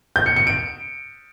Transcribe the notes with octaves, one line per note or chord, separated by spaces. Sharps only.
G6
C#7
C#7
D7